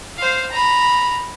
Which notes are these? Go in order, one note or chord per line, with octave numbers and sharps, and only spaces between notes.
C5 F5
A#5 B5